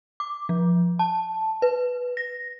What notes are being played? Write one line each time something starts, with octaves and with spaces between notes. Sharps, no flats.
D6
F3
A5
B4
A#6